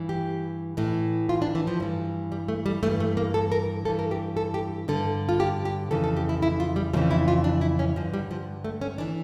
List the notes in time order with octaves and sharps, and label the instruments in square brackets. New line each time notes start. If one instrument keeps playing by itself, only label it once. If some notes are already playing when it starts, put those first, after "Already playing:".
Already playing: [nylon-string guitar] G2 E3
G4
A2 E3
F4
D4
E3
F3
G2 E3
G3
A3
G3
G2 E3 A3
A3
A#3
A4
A#4
G2 A4
E3
A#4
G4
A4
G4
G2 D3 A4
F4
G4
G4
F2 C#3 E3 A4
A4
G4
E4
E4
F4
G3
F2 C#3 E3 F3
E4
F4
D4
E4
C#4
G2 D3 F3
G3
F3
A3
C#4
E3 D4